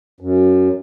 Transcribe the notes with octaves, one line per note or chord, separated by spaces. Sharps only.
F#2